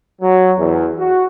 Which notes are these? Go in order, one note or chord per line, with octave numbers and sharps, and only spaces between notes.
F#3
E2
F#4